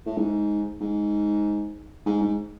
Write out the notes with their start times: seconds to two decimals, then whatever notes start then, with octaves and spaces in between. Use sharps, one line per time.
0.06 A2
0.18 G#2
0.81 G#2
2.06 G#2
2.22 G#2